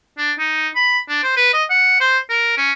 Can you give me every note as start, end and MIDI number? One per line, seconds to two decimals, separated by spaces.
0.17 0.32 62
0.39 0.68 63
0.76 0.99 83
1.09 1.22 62
1.23 1.34 72
1.37 1.53 71
1.53 1.64 75
1.70 1.96 78
2.00 2.18 72
2.29 2.55 70
2.57 2.72 61